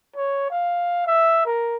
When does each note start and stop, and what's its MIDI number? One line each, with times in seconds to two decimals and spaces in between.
0.15 0.46 73
0.51 1.02 77
1.06 1.45 76
1.45 1.77 70